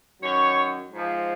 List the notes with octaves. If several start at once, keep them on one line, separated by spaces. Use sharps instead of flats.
F#2 D#3 F#3 C#5
G#2 F3